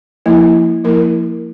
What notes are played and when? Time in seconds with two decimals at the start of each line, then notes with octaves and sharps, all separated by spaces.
0.26 F3 A#3 E4
0.84 F3 A#3 E4 A#4